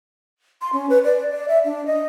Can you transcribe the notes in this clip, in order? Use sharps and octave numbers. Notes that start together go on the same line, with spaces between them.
C6
C#4
B4
D5
D5
E5
D4
D#5